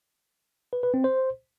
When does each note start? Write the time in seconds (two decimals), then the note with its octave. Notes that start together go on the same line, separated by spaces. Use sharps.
0.73 B4
0.83 B4
0.94 C4
1.04 C5